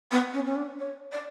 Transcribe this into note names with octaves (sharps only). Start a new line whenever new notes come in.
B3
C#4
C#4
D4
C#5
D5